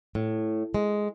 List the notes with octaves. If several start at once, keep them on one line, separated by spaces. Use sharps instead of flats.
A2
G#3